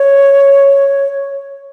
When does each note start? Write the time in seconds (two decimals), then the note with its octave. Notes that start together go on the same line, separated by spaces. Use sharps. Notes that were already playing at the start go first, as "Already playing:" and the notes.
Already playing: C#5